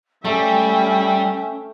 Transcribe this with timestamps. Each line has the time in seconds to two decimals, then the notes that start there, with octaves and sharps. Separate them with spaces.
0.25 G3 A3 C#4 E5 G5